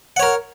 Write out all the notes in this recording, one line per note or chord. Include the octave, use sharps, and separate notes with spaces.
A#4 C#5 F#5